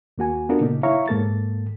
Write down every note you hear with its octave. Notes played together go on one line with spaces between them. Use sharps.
D#2 A#3 F#4 G#5
B3 D4 F4 F#4 A4 A#4
A#2 C#3 A#3 D#4
E4 C#5 E5 F5 A#5 C#6
G#2 A#3 A4 A6